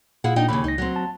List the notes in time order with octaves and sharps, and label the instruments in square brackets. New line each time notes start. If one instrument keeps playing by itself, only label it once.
[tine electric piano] A#2 F5 [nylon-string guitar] E4 G#4 F#5
[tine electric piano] A#2 D4 [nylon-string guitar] D#4 D#5 G5
[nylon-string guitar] D#2 C#3 [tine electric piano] B5
[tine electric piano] C#2 A#6 [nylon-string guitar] D#4
[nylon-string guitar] F#3 C4
[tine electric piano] A5